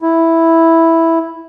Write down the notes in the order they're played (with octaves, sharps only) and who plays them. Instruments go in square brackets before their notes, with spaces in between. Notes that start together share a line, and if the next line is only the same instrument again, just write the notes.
[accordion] E4